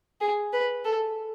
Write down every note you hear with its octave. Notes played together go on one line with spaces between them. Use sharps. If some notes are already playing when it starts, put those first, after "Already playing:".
G#4
B4
A4